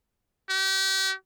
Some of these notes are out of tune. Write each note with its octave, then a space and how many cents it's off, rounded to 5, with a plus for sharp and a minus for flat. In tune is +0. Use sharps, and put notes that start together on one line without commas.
G4 -35